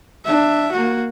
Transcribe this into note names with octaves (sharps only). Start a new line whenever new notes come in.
D4 E5
A#3 F#4